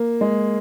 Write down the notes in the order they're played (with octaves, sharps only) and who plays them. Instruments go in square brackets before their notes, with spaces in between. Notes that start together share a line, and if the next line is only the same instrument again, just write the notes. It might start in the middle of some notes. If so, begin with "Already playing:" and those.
Already playing: [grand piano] A#3
G#3